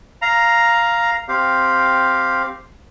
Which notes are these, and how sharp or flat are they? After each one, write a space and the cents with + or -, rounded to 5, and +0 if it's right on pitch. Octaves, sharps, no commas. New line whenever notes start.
F5 -5 A#5 +5
C4 +0 G4 +0 F5 +0